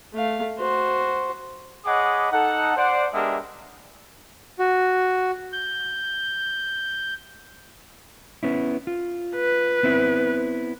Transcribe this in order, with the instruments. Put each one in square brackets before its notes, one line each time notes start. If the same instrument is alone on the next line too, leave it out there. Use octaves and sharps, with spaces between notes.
[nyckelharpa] A3 F5
F#4 C5
[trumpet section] G#4 C#5 D#5 F#5 B5 D6
D#4 A4 F#5
C5 D5 F#5
G#3 B3 D4 G4 A#4 E5
[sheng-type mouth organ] F#4
G6
[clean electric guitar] B3 C#4 E4
F4
[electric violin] B4
[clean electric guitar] B3 C4 E4